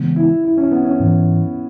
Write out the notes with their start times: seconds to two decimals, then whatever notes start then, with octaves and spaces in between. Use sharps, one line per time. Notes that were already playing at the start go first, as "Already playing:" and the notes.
Already playing: C#3 E3 G#3 B3
0.16 E4
0.44 E4
0.57 C#4
0.71 B3
0.85 C#4
1.00 G#2 E3 B3